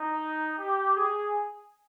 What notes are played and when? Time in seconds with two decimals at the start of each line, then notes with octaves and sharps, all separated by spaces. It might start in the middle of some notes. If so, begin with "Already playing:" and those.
Already playing: D#4
0.59 G4
0.95 G#4